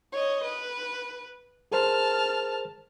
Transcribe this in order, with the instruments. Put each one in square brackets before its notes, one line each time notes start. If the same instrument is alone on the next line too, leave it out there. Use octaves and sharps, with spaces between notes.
[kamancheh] C#5 D#5
B4
[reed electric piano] G#4 A#4 C5 [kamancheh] A5 F6